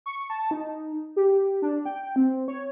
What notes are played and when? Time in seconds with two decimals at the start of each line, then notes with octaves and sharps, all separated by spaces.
0.06 C#6
0.30 A5
0.51 D#4
1.16 G4
1.62 D4
1.86 G5
2.16 C4
2.48 C#5